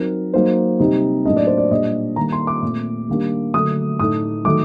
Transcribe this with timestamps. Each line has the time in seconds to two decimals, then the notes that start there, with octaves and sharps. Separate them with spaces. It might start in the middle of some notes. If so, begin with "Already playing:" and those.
Already playing: F#3 C4 D#4 A#4
0.34 F#3 A#3 D#4 C5
0.80 C3 G3 C4 D#4
1.25 A2 F#3 A#3 D4 D#5
1.36 D5
1.47 C5
1.57 D5
1.71 A#2 G3 D4 D#5
2.16 D#3 G3 A#3 A#5
2.32 C6
2.47 D6
2.63 A#2 A3 C4
3.08 D#3 G3 A#3 D4
3.54 D3 F#3 A3 D#6
3.99 A2 A3 D#4 D#6
4.45 D#3 F#3 A3 D#4 D6